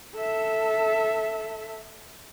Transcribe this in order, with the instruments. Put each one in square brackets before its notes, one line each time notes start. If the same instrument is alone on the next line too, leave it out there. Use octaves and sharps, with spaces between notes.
[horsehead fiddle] A4 E5